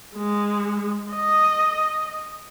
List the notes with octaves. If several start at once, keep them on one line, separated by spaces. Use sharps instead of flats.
G#3
D#5